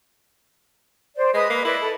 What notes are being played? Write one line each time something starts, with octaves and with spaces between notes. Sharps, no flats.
C5 D5
G#3 B4 D#5 D#6
A#3
E4 B4 D5 D#5
A4 B4